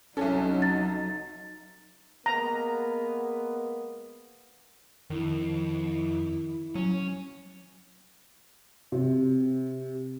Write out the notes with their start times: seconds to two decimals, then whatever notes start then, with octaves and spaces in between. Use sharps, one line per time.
0.17 C2 F#3 C#4 D#4 A4
0.62 A6
2.26 G#3 A#3 B3 A#5
5.10 F2 D#3 E4
6.75 F#3 C#4
8.92 C3